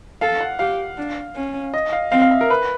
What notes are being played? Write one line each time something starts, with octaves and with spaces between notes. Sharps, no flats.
A4 F5
F#5
G4 F5
D4
C#4
D#5
F5
C4 F5
F5
E5
A#4
B4